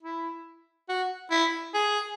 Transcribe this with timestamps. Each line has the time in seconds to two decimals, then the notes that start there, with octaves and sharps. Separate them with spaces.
0.02 E4
0.89 F#4
1.30 E4
1.74 G#4